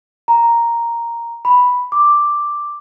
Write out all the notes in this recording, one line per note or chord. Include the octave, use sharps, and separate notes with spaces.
A#5
B5
D6